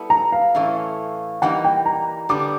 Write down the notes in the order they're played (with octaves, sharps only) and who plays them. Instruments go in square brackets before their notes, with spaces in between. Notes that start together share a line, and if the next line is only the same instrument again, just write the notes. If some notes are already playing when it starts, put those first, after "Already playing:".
Already playing: [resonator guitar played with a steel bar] G3 B3 E4 A4
[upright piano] A#5
F5
[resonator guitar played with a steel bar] A2 E3 A3 C#4
[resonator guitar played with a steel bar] E3 G3 A#3 D#4 [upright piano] F#5
[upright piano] G5
A#5
[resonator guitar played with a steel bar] D3 G3 B3 D4 [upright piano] D6